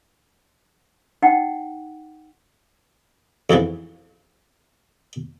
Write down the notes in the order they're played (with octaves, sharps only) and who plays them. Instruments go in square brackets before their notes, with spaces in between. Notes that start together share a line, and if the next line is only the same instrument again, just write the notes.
[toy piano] D#4 F#5 G5
[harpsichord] F2 G#2 E3 F3